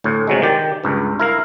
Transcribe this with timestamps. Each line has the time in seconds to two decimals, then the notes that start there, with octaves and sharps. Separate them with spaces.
0.04 D2 A2
0.27 C3 F#3 G#3
0.42 D#3 G4 D5
0.84 C#2 G2
1.20 E4 A#4 F5